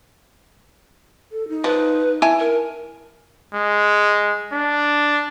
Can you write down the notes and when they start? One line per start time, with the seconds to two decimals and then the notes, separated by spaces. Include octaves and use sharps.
1.32 A4
1.49 D#4
1.64 F3 B4
2.22 E4 G#5 A5
2.40 A#4
3.54 G#3
4.52 D4